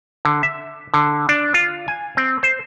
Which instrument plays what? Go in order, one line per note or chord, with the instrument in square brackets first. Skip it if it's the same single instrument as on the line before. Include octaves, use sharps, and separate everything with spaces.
[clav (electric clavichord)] D3
E5
D3
D4
F4
G#5
C4
C5